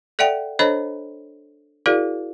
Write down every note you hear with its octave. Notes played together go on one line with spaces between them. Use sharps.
A4 D5 E5 F#5 G5
D4 A4 C5 C#5 D#5 B5
E4 F#4 G#4 A#4 D5 F5